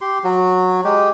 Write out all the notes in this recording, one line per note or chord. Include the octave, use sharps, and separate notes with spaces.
G4 C6
F#3 F#4
G#3 G4